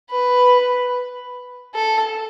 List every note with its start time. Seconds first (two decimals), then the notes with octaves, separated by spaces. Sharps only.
0.10 B4
1.75 A4